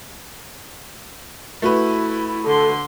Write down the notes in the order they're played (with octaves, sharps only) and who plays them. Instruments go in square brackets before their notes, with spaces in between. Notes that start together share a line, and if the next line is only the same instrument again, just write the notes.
[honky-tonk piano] A3 F#4 B4 [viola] E4
[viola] D3 C6 [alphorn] A4